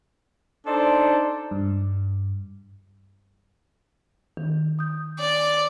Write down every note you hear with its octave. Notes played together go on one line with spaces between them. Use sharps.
D4 D#4 A4 C5 D5
G2
D#3
D#6 G6
D5